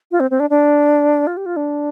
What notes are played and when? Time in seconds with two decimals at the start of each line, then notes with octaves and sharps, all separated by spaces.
0.12 F4
0.20 C4
0.31 C4
0.40 D4
0.50 D4
1.27 F4
1.37 G4
1.46 F4
1.56 D4